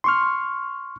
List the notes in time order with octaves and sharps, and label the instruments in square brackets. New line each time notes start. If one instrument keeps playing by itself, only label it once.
[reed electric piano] C6 C#6 F6